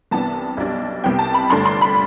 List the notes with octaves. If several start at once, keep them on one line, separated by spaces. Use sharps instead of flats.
C2 C3 E3 B3 D4 A5
B1 B2 G3 D4
C2 C3 G3 B3 G5
A5
B5
G1 G2 D3 A3 D4 C6
C6
B5